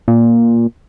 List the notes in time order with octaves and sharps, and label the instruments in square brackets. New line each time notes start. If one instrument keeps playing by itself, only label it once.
[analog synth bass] A#2